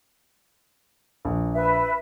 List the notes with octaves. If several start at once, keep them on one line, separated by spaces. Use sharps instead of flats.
A#1
B4 E5